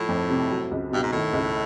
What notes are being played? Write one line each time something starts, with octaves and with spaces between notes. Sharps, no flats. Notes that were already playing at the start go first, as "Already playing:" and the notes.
Already playing: A2 F3
F2
C3
F#3
C#2
G2 B2
G#2
A2 D#3
C#2